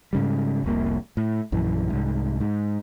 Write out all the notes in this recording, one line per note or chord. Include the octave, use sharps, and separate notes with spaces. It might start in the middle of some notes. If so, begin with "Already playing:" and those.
G#2 C#3 G3
F1 C2 A#3
A2
A#1 F#2 E3
C2 G#2
G#2